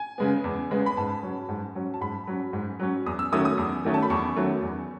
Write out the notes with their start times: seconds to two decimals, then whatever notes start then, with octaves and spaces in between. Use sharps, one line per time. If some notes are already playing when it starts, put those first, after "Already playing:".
Already playing: G#5
0.18 C#3 G#3 B3
0.44 E2
0.71 C#3 G#3 B3
0.86 B5
0.97 G#2 A5
1.23 F#3 C#4
1.49 G#2
1.75 F#3 C#4
1.94 A5
2.01 G#2 B5
2.27 F#3 C#4
2.53 G#2
2.79 F#3 C#4
3.06 E2 D#6
3.19 E6
3.32 D#3 F#3 A3 C#4 D#6
3.45 D#6
3.58 E2
3.84 D#3 F#3 A3 C#4
3.94 A5
4.02 B5
4.10 E2 C#6
4.36 D#3 F#3 A3 C#4
4.62 E2